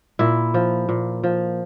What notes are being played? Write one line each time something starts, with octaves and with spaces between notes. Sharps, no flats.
A#2 E4
F3
A#2
F3